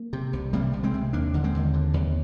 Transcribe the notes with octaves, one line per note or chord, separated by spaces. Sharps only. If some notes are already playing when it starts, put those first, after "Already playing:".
Already playing: A#3
C3
C2
C3 G3 A#3
C2
G#3 C4
C3
D#2 A#3 D4
D3
G#3 C4
D#2
D3
D#2